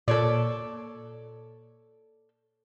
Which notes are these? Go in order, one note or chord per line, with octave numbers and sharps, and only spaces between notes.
A#2 A4 C#5 D5